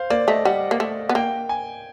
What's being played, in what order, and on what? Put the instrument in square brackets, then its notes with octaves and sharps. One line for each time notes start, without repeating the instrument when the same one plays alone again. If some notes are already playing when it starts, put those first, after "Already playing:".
Already playing: [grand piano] C5 F5
[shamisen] A#3 [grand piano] D5
[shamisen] A3 [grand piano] D#5
[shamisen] G3 [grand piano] F#5
[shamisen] A#3
A3
B3
[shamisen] A#3 [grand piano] G5
[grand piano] G#5